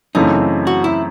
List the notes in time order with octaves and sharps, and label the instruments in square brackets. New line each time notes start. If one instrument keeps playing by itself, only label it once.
[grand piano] F#2 C#3 E3 A3 C4 [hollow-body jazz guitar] D#4
[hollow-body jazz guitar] F#4
E4